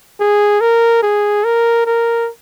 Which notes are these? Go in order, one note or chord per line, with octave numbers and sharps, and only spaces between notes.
G#4
A#4
G#4
A#4
A#4